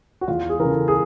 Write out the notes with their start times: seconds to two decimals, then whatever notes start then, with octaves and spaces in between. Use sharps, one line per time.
0.21 F#4
0.28 E2 F4
0.49 G#4
0.60 C#3 E3 A#4
0.71 A4
0.88 G#4